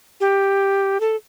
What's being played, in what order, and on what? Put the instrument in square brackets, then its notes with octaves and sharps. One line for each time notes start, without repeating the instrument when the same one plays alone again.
[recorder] G4
A4